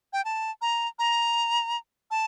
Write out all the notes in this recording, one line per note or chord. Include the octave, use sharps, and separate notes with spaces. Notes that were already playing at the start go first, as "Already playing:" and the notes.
G5
A5
A#5
A#5
A5